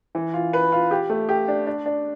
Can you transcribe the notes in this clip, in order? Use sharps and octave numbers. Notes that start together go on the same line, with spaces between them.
E3
F4
B4
F4
G4
A3
G4
D4
D4
D4